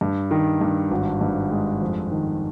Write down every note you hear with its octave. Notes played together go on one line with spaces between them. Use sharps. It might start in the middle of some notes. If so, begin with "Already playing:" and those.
G2
D#3
G2
G#1
G2
G#3
F2
D#3